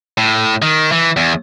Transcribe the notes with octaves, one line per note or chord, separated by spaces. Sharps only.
A2
D#3
E3
E2